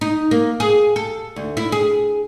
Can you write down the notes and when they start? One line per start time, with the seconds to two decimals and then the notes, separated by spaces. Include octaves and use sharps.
0.01 D#4
0.31 A#3
0.60 G#4
0.96 A4
1.36 D2
1.57 E4
1.72 G#4